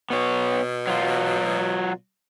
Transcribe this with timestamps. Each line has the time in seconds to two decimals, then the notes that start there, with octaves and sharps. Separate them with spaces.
0.10 B2 B3 C#5
0.87 F#3 F4